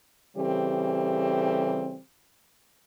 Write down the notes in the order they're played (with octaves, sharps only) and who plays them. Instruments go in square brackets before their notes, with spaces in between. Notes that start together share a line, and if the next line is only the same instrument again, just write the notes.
[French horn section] C#3 E3 G3 C4 G4 A4